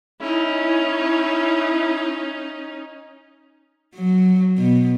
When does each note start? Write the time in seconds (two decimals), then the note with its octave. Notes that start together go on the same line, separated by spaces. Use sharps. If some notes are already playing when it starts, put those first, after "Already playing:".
0.20 C#4 D#4 E4
3.95 F#3
4.58 B2